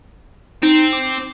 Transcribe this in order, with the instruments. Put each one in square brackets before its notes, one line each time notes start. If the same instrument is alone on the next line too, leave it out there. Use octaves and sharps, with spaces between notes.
[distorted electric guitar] C4 [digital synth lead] D#4
[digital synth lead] D6